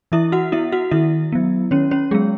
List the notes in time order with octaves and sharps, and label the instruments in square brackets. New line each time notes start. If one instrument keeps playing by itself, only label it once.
[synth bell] E3 E4 E5
F#4 F#5
B3 E4 E5
F#4 F#5
D#3 E4 E5
F#3 B3
D#3 C#4 C#5
C#4 C#5
F#3 G#3 B3 G#4